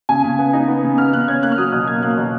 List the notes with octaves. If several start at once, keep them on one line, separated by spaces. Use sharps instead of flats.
C#3 G#5
C#3
B3
D#4
B3
C#3
B3 F6
C#3 F#6
C#4 G#6
A#3 F#6
F6
F#3 D#6
B2 F6
A#3 G#6
A#3 F#6
B2